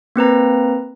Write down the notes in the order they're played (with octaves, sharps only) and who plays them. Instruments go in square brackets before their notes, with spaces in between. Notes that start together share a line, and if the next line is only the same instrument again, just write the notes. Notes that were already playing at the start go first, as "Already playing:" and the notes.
[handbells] A#3 C4 B4 A#5